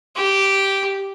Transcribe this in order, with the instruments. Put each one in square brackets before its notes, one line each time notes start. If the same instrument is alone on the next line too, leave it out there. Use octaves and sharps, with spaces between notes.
[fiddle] G4